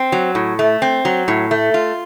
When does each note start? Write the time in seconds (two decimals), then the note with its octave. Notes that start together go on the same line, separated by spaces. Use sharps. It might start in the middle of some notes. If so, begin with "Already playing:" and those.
Already playing: C4
0.12 F#3
0.35 A2
0.59 A3
0.82 C4
1.05 F#3
1.28 A2
1.51 A3
1.74 F4